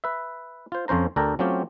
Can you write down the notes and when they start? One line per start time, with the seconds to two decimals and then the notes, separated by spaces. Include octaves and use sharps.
0.04 B4 E5
0.72 F4 C5
0.88 F2 F3 C#4 C5 A#5
1.16 D2 D4 A4 A#4 G5 A#5
1.39 F#3 A3 C4 C#4 F4 G4